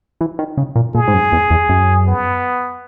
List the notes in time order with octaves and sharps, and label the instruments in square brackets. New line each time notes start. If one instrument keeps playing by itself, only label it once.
[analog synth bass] E3
D#3
C#3
A#2
[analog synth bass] A#2 [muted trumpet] G#4
[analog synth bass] G#2
F#2
E2
E2
F#2
[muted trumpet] B3